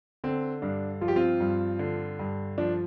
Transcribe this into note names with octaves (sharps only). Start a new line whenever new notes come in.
D3 C4
G2 D4
F3 F4
G4
C4 F4
G2
D3
G2
F3 D4